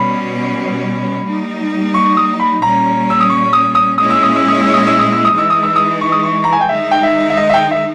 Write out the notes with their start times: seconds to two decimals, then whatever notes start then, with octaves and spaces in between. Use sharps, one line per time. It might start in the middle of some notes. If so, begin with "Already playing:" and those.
Already playing: B2 G3 C#4 B5
1.26 G3 A#3 D#4
1.94 C#6
2.17 D#6
2.39 B5
2.62 A#2 G3 C#4 A#5
3.10 E6
3.20 D#6
3.30 C#6
3.53 D#6
3.75 D#6
3.98 A#2 G#3 C#4 E4 D#6
4.10 E6
4.23 D#6
4.36 E6
4.48 D#6
4.61 E6
4.74 D#6
4.87 E6
4.99 D#6
5.12 E6
5.25 D#6
5.33 E3 G#3 D#4 E6
5.50 D#6
5.63 E6
5.76 D#6
6.01 C#6
6.12 D#6
6.23 C#6
6.44 A#5
6.52 G#5
6.61 G5
6.69 D#3 G#3 D#4 E5
6.91 G5
7.03 E5
7.30 E5
7.37 D#5
7.49 E5
7.54 G5
7.71 E5